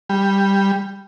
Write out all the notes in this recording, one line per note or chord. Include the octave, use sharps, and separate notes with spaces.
G3